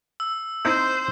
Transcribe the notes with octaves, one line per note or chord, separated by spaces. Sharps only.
E6
C4 D#4 E4 C5